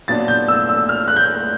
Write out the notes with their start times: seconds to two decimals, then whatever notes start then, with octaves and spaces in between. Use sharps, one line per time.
0.08 A#2 F#3 B3 D4 A6
0.28 G6
0.48 E6
0.69 E6
0.89 F6
1.08 F#6
1.16 G6